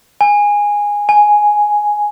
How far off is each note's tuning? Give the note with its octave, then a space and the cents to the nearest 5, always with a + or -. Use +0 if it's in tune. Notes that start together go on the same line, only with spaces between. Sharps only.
G#5 -10
G#5 +5